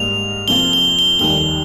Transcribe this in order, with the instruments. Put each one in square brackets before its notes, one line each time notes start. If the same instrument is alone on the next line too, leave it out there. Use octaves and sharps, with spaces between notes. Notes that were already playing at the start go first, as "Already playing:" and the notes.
Already playing: [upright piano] G#2 G3 A#3 D#4 [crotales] F7
[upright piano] F2 C3 F3 A#3 F4 [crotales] G7
[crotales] G7
G7
[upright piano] F1 D#2 D#3 G3 A#3 [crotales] G7